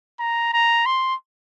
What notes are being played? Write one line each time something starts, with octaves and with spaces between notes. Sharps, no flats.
A#5
A#5
C6